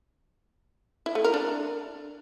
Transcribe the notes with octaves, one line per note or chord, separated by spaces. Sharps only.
E4
A3
A#4
D4